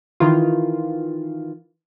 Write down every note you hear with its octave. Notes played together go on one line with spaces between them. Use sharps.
D#3 E3 F4